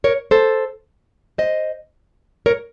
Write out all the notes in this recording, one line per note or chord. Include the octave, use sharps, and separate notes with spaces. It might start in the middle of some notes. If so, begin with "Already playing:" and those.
A#4 C#5
A4 C5
C5 D#5
A#4 C#5